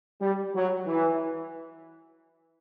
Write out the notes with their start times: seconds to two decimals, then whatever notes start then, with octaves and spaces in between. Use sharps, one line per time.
0.21 G3
0.55 F#3
0.87 E3